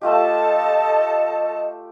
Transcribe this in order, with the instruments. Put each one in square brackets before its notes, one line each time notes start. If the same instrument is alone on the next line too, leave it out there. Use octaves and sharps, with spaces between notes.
[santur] A3 F4 G4 [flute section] A4 A5 [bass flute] D#5